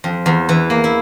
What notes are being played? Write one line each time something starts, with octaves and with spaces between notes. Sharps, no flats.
F2
E2
E3
A#3
E4